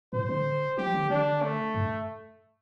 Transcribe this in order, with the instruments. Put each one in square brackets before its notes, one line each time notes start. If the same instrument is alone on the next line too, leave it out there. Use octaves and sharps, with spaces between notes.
[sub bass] A2 [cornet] C5
[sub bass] D3
[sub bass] F3 [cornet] G4
[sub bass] D3
[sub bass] D3 [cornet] D4
[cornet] A3
[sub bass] G2